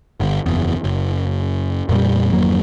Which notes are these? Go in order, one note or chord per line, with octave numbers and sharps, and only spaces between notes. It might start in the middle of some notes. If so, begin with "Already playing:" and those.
G1
F#1 E2
F#1
F2 A#2 G3
G#1 F2 F#3 A#3